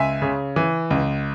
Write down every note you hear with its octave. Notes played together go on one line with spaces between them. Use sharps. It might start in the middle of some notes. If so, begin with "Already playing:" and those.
Already playing: C#2 E5 G#5
C#3
E3
C#2